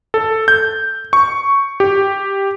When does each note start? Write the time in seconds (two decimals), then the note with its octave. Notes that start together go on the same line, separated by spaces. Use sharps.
0.14 A4
0.48 G6
1.13 C#6
1.80 G4